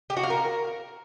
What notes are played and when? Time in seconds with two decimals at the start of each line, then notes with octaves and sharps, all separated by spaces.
0.10 G4
0.17 F#4
0.23 F5
0.30 A#4